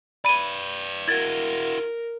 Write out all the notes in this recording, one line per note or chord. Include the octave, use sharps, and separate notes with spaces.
B4 D5 B5 D#7
E4 F#4 A#4 G#6 A6